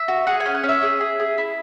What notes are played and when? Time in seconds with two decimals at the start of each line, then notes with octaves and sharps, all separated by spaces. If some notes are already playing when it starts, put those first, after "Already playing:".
Already playing: E5
0.08 F#4
0.27 G#4 F#5
0.40 G#5
0.46 C#4
0.55 F#5
0.64 C#4
0.69 E5
0.82 G#4
1.01 G#4
1.20 G#4
1.38 E4